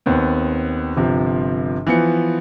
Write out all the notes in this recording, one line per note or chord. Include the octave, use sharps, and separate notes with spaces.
D#2 B3 C4
G1 C3 F3
E3 F3 B3 C#7